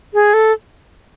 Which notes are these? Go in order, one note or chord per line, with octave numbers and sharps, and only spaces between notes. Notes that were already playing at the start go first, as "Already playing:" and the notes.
G#4
A4